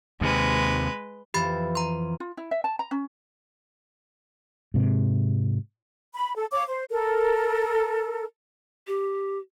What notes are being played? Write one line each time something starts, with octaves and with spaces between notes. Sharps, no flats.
D#2 C3 G#3 B4
F2 E3 G4 B5 A6
A#5 C6
F4
E4
E5
A5
A#5
C#4
G#2 C3
B5
A4
C#5 F5 D6
C5
A4 A#4
G4